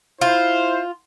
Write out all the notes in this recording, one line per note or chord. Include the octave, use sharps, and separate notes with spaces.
E4 F4 C5